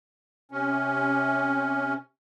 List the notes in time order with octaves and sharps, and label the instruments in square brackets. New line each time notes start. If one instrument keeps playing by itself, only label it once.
[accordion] C3 C#4